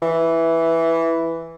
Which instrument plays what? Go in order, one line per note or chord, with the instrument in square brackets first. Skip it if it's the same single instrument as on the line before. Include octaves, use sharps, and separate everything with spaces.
[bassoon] E3